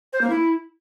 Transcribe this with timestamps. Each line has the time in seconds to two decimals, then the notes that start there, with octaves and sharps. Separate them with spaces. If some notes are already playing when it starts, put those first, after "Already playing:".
0.13 C5
0.21 A#3
0.30 E4